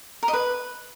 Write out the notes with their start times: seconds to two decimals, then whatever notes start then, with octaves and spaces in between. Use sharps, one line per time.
0.23 A#4
0.28 D#5
0.33 B4